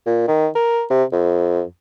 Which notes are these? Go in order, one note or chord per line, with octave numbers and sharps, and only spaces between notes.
A#2
D#3
A#4
C3
F2